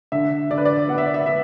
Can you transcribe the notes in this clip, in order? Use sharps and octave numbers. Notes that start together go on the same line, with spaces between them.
D3 E5
D3 D5
B4
D5
B3 F#5
E5
D5
E5
B3 E5